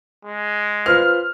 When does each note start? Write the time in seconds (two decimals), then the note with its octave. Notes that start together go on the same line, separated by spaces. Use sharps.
0.25 G#3
0.86 F4 B4 C5 F6